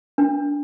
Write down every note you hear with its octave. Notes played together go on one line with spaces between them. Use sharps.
D4